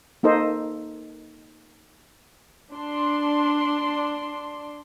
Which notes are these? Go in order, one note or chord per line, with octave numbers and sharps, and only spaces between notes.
A#3 D#4 A4 C5 D#5
D4 C6